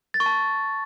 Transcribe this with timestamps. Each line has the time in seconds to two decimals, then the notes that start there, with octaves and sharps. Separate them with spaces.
0.14 A6
0.20 C#6
0.26 A5